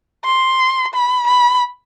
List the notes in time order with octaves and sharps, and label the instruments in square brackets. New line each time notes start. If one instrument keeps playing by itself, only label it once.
[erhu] C6
B5
B5